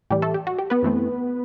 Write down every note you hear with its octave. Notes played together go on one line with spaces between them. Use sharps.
A2 E3 G3 G4
A3 A4
G4
F#4
G4
B3 B4
F#2 E3 A3 C4